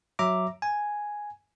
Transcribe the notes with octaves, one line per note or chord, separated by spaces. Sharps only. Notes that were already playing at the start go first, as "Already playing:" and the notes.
F#3 E5 A#5 D6
G#5